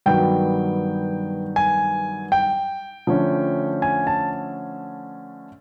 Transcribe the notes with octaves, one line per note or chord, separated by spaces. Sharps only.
G2 D#3 F#3 B3 G5
G#5
G5
D3 F3 A3 C#4
G#5
A5